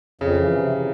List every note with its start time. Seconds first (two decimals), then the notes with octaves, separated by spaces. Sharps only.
0.21 F2 C#3
0.37 E3
0.54 C3